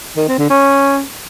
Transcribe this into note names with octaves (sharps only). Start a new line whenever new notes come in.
D#3
C4
D3
C#4